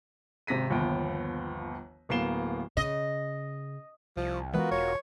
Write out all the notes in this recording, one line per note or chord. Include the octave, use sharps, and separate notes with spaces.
G#1 C3 A#6 B6 D#7
G1 D#2 F3 B3 G5
D1 A#3 B3 C7 E7 G7
C#3 D#5
C2 F3
E3 G#3 B3 F4 F#4 A#4
E1 C#5